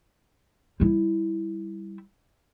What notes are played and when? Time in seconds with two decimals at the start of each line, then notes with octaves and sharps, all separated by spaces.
0.80 G3 E4